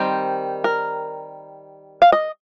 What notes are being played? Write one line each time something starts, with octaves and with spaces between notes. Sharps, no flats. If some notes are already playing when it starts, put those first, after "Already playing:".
Already playing: D#3 G3 C4 C5
A#4
F5
D#5